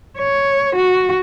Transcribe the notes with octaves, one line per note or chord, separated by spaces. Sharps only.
C#5
F#4